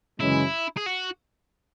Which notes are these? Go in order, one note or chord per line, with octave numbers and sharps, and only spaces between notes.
F#2 C#3 E3 G#3 C#4 E4
G#4
F#4